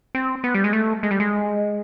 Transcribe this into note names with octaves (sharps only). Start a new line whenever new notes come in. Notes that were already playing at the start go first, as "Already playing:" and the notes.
C4
B3
G3
G#3
A3
G#3
G3
G#3